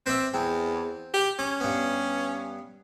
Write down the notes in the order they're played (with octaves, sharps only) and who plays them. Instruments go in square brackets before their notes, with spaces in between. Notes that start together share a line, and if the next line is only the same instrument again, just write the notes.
[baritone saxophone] C4 [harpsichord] B4 D5 E5
[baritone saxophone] E2 [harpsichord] C4
[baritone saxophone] G4
[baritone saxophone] C#4 [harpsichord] D6
[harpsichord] G2 B3